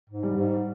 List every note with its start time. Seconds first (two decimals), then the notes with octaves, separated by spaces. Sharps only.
0.10 G#2
0.23 G3
0.36 G#2